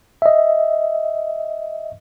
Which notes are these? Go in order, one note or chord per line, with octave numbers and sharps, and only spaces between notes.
D#5 E5